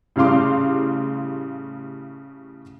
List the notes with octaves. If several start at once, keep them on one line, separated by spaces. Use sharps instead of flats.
A2 C#3 G3 F5 C6 D6